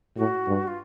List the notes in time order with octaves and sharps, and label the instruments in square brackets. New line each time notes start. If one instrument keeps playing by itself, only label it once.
[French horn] A2 [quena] F#4
[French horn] G2
[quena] F4